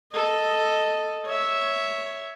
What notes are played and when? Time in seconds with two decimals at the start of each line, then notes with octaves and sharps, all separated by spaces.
0.13 A4 D#5
1.26 C#5 E5